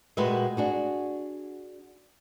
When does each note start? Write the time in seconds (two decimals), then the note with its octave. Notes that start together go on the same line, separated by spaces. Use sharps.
0.17 A#2 G#3 F#4 G4 B4 E5
0.57 D4 F#4 G#4